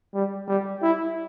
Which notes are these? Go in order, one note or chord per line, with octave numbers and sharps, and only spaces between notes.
G3
G3
E4